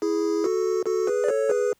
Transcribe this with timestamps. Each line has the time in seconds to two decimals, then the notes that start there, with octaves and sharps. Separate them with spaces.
0.02 E4 G#4
0.44 F#4 A4
0.86 F#4 A4
1.07 G#4 B4
1.24 D5
1.28 A4 C#5
1.49 G#4 B4